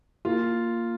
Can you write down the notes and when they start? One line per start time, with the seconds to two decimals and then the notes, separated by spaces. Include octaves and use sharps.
0.25 A#3 F4